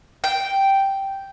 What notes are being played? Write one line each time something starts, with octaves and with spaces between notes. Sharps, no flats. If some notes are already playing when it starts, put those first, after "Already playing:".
G5